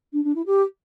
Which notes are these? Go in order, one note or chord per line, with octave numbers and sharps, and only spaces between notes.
D4
D4
E4
G4